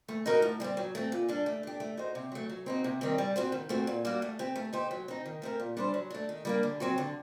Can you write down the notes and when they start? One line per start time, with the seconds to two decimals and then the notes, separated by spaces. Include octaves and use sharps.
0.08 A3
0.26 D#4 F#4 A#4
0.42 A2
0.60 G3 C4 G4
0.77 F#3
0.95 A3 C4
1.12 A#2
1.29 G3 D4 A4
1.46 A3
1.63 D4 G4
1.80 A3
1.97 D#4 F#4 C5
2.15 C3
2.32 F#3 A3
2.49 F#3
2.66 C4 D#4 F#4
2.84 C3
3.01 D#3 G3 C4 G4
3.18 G3
3.36 C4 F#4 C5
3.52 D#3
3.69 A3 C4 F#4
3.87 A#2
4.05 G3 A#3 F#4
4.22 A3
4.39 C4 G4
4.56 A3
4.73 D#4 G4 C5
4.91 F#3
5.08 C4 D#4
5.26 D#3
5.42 A3 C4 G4 A#4
5.60 A#2
5.77 G3 D4 A4 C5
5.94 F#3
6.10 A3 D4
6.29 D#3
6.45 G3 A#3 D4
6.63 D3
6.80 F#3 C4 F#4
6.98 D3